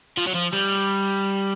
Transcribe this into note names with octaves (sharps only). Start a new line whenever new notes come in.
F3
F#3
F3
G3